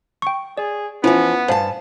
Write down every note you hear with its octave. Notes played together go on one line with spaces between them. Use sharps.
G5 C#6
G#4 D5
E3 F3 B3 C#4 E4 G#5
G2 C5 F5 G#5 A5